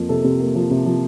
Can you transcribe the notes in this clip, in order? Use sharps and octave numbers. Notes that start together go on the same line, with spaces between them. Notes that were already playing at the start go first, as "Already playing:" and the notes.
Already playing: F2 A#3
C3 A4
C3
A#3
F3
C3
F3